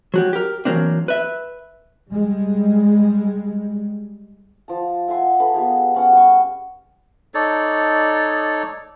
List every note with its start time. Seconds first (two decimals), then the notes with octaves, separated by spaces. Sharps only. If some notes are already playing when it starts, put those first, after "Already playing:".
0.14 F#3 F#4 G4
0.33 G4 A#4
0.65 E3 F#3 A#3 C4 D4
1.08 B4 E5
2.11 G3 G#3
4.68 F3 A5
5.08 E5 F#5 G#5 C6
5.40 D4 A4 B4
5.54 B3 F4 G4 G#4
5.94 B3 C#4 F#5
6.13 G3 G4 C#6
7.34 D#4 A4 C#5 D5